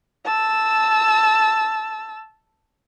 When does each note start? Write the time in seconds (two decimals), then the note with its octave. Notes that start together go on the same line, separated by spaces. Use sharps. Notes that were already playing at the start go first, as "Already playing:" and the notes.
0.25 A5 E6